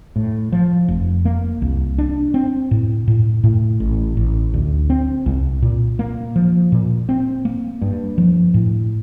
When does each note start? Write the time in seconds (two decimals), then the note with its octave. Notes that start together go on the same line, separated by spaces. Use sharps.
0.16 A2
0.52 F3
0.88 F1
1.25 A#3
1.62 C2
1.98 D4
2.34 C4
2.71 A2
3.08 A2
3.44 A2
3.80 A1
4.17 A1
4.54 D2
4.90 C4
5.26 C2
5.62 A#2
5.99 A#3
6.36 F3
6.72 A#2
7.09 C4
7.45 A#3
7.82 G2
8.18 F3
8.54 A2